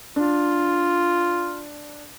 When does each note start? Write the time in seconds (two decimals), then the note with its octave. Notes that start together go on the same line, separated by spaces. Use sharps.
0.16 D4 F4